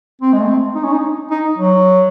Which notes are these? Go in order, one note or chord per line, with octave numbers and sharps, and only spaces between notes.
C4
G#3
A3
C4
D#4
C#4
D#4
D#4
F#3